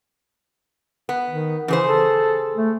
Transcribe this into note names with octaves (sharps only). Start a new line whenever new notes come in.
B3
D#3
C#3 E3 G#4 C5
A4
A3